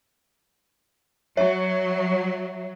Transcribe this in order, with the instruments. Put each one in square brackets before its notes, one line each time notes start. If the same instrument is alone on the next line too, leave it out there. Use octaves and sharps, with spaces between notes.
[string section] F#3 [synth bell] C#5 E5